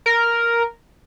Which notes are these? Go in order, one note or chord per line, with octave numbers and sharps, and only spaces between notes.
A#4